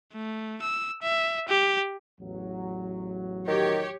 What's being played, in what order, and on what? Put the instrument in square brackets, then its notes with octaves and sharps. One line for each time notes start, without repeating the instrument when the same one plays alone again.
[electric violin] A3
E6
E5
G4
[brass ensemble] A1 E2 F#3
[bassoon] D#3 [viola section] G4 C#5